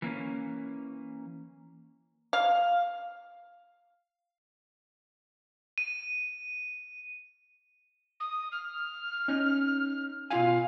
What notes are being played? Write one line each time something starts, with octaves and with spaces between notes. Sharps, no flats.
E3 A#3 C#4
F5
D#7
D#6
F6
C#4 D#4
B2 F4 F5 G#5